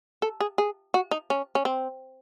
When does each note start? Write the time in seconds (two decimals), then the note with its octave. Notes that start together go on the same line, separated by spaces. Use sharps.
0.22 A4
0.40 G#4
0.58 G#4
0.94 F#4
1.11 D#4
1.30 C#4
1.55 C#4
1.65 C4